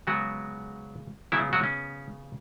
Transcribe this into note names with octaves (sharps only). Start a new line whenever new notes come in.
C#3 F#3 G#3 B3 F#4
C#3 F#3 B3 E4
F#3 F#4
C#4